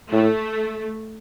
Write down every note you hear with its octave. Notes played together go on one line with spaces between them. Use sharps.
A2 A3